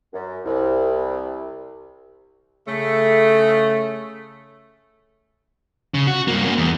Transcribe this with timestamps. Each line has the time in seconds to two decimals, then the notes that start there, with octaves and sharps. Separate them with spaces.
0.13 F#2
0.45 C2
2.67 C#3 A3
5.94 C#3
6.07 F#4
6.28 G2 A#3
6.44 A#3 C#4
6.57 E2